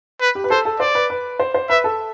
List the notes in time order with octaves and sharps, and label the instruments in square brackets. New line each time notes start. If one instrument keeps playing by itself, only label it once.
[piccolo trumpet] B4
[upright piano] G4
B4
[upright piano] A4 [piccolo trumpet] C5
[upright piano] A4
[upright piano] C5 [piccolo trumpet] D5
[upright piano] B4
B4
C5
C5
[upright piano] B4 [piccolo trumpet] E5
[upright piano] A4